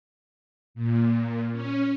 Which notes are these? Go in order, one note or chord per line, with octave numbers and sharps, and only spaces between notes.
A#2
C#4